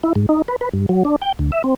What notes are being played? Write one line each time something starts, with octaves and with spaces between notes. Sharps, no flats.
E4
G#2
D#4
B4
B4
G2
F#3
D4
G5
D2
E5
C4